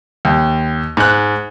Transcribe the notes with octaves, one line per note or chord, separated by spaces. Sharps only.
D#2
G#2 F#6